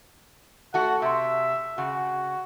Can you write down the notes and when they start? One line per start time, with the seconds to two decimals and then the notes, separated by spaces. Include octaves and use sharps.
0.74 A3 F#4 F#5
1.02 C3 E5
1.78 C#3 F#4